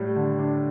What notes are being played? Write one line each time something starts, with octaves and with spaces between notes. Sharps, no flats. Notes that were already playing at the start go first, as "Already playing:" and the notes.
Already playing: A2 G3
D3
D4